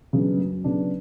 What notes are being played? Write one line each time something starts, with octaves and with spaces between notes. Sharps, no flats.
C#3 F#3 B3 D4
F#2
C#3 F#3 B3 D4